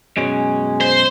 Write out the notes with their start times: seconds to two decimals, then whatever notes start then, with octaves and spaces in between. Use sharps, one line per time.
0.17 F#2 B2 G#3 C#4
0.81 C5